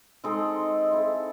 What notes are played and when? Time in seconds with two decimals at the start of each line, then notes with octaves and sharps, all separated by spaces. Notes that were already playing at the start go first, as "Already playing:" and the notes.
0.24 G#3 C4 D#4 A4
0.91 C4 E4 A4